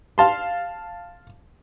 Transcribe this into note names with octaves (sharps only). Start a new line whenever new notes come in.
F5 A5 C6